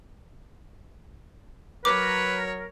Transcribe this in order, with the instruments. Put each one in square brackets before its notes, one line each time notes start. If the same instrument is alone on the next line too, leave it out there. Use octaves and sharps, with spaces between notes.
[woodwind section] F#3 A#4 [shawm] B4 [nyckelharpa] C#5 [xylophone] D6